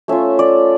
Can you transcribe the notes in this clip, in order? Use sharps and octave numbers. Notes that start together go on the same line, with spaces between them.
A3 C#4 F4 E5
D5